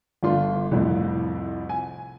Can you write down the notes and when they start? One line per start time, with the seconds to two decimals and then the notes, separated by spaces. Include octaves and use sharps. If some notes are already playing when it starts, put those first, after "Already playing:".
0.23 G1 D4 F4 C6
0.71 C2 F2 A2
1.69 G#5